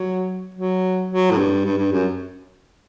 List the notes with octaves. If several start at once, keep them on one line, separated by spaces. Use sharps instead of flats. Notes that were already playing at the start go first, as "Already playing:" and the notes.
Already playing: F#3
F#3
F#3
A2
G2
G2
G2
F#2